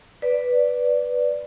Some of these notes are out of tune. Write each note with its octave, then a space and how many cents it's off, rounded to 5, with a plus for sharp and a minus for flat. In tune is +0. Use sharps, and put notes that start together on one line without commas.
B4 +0 D5 +0